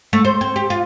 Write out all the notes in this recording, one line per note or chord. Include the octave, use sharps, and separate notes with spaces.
A3
C5
C4
G4
F4